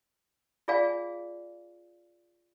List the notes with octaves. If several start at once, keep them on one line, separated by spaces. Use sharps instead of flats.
F4 G#4 D5 F5 G#5